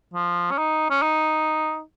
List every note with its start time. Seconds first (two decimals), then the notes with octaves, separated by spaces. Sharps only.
0.14 F3
0.51 C#4
0.58 D#4
0.90 C#4
1.02 D#4